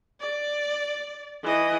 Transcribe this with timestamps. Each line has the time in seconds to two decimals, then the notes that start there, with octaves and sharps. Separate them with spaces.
0.20 D5
1.43 E3 D#5